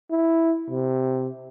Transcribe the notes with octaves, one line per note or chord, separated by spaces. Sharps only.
E4
C3